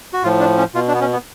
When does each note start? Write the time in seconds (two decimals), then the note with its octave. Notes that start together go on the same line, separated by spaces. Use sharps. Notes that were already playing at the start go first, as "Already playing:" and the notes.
0.13 F#4
0.23 A2 F3 F4
0.40 D4
0.58 C#4
0.75 B2 F4
0.88 D4
0.94 B3
1.01 C#4
1.13 B3